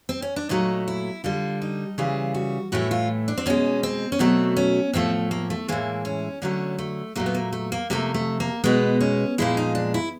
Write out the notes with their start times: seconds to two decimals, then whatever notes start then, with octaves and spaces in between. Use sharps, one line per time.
0.09 C4
0.22 C#4
0.36 D4
0.49 A#2 F#3 A3 D#4
0.88 E4
1.24 D3 G3 F4
1.62 D#4
1.98 C#3 E3 G3 F4
2.34 F#4
2.72 A2 E3 A3 F#4
2.91 F4
3.28 D4
3.38 C4
3.46 B2 G#3 C#4
3.83 C4
4.12 C#4
4.19 B2 F#3 A3 C4
4.57 C#4
4.93 A2 F3 A3 C4
5.31 A#3
5.50 A3
5.68 A2 E3 G#3 A#3
6.05 C#4
6.42 D3 F#3 A3 C#4
6.78 A3
7.15 A#2 F#3 A3 A#3
7.26 B3
7.35 A#3
7.52 A3
7.72 A#3
7.90 C3 F3 A3 A#3
8.14 A3
8.40 A#3
8.64 B2 G#3 B3
9.01 C#4
9.38 A#2 F3 G#3 E4
9.57 D#4
9.75 D4
9.94 E4